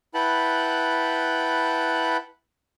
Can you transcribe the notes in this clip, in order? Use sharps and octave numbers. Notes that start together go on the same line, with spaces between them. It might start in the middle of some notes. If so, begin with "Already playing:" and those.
E4 B4 F#5 G5 A5 B5